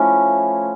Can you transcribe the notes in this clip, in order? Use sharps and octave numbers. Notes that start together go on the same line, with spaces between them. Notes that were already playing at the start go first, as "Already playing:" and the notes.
Already playing: F3 A3 C#4 E4